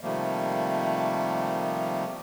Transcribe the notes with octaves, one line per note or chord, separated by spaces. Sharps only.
C3 D#3 F3 G3 A3 A#3